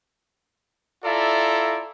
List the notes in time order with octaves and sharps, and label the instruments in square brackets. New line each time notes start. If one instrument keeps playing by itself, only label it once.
[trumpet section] E4 F4 A4 D5 E5 A#5